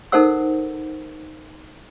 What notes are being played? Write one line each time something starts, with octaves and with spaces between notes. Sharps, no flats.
D#4 A4 A#4 C5 F#5 E6